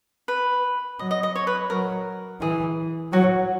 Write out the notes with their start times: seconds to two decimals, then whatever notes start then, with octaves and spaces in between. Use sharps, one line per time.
0.28 B4
0.99 F#3 D#5
1.11 D#5
1.23 D#5
1.36 C#5
1.47 B4
1.70 F#3 A#4
2.41 E3 G#4
3.12 F#3 F#4